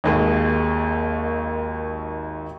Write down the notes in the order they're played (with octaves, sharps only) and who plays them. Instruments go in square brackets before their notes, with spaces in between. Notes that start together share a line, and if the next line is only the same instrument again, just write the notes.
[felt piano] G#1 D#2 G#4